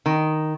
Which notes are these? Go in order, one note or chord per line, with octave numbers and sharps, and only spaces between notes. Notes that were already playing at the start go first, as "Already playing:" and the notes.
D#3